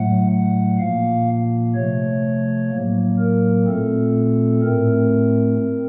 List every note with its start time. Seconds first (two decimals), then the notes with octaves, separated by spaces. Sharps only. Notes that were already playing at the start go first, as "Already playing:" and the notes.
Already playing: A2 F#3 A3 F#5
0.31 F#5
0.79 A#2 F3 A#3 F5
1.75 C3 F3 A3 C#5
2.71 A2 F#3 A#3
3.19 A#4
3.67 A#2 A3 C4 A4
4.63 A2 A3 C4 A#4
5.59 C4